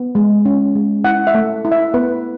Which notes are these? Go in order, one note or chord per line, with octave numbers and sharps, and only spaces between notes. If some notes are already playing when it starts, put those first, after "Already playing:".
Already playing: B3
G#3
C#4
G#3
E4 F#5
E5
A3
E4
E5
B3 B4